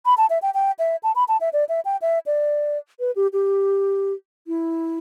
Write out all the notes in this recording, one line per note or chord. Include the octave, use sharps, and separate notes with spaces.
B5
A5
E5
G5
G5
E5
A5
B5
A5
E5
D5
E5
G5
E5
D5
B4
G4
G4
E4